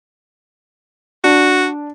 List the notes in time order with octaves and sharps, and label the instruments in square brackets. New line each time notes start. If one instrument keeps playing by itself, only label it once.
[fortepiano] D4 [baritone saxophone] F#4